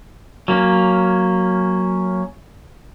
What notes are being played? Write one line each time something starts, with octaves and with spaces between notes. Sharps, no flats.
F#3 A#3 C#4